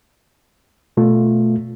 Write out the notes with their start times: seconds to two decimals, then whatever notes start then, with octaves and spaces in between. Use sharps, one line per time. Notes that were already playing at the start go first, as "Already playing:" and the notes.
0.97 B2 A3 F4